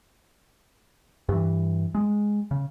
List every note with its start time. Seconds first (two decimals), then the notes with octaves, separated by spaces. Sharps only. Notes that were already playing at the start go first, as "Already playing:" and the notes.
1.29 G2 E3
1.95 G#3
2.51 C#3